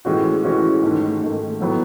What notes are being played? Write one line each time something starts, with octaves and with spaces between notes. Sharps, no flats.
A2 E3 G#3 C#4 F#4
A2 E3 G#3 C#4 F#4
G#2 D#3 A3
G#2 D#3 A3
A2 F#3 B3